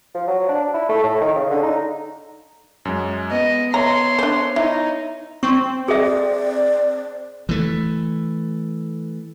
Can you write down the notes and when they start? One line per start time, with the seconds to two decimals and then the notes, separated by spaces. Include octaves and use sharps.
0.14 F3
0.27 F#3
0.48 D4
0.74 E4
0.89 A3
1.03 A2
1.21 D#3
1.35 C#3
1.50 D3
1.63 D#4
2.85 F#2 G#3
3.32 B3 D#5
3.74 B3 C#5 E5 A#5 C6
4.19 D4 C5
4.56 D#4 E4
5.43 C4 C#6
5.88 G#4 A4 D5 E5
7.49 E3 A3